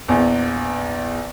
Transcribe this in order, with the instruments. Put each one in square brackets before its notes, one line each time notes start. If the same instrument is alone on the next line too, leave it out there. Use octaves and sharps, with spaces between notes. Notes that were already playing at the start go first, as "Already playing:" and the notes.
[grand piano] A#1 E2